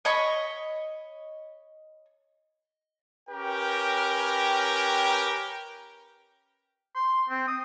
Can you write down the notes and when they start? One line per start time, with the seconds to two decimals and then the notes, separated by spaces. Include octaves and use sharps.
0.05 C#5 D#5 B5 C#6
3.30 C#4 G4 A#4 B4 G5
6.95 C6
7.29 C4
7.48 D#6